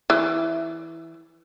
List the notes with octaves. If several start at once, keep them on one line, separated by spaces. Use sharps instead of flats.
E3